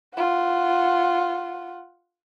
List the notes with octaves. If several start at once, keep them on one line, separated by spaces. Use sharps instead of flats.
F4 F#5